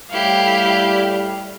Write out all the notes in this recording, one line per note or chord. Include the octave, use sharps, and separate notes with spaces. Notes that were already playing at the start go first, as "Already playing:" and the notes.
A2 G3 E4 G4 F5